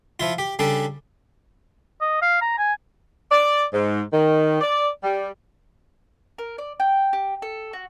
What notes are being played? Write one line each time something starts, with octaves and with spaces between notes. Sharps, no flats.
F3 E4 F4
G4
C#3 G3 D4 A4
D#5
F5
A#5
G#5
D5
G#2
D#3
D5
G3
A#4
D5
G5
G4
A4
F#4